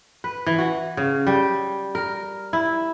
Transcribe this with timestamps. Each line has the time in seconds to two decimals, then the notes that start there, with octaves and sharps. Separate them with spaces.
0.24 B4
0.46 E3
0.58 F#4
0.97 C#3
1.27 G3
1.95 A#4
2.53 E4